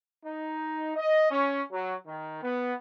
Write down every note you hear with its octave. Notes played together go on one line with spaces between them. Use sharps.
D#4
D#5
C#4
F#3
D#3
B3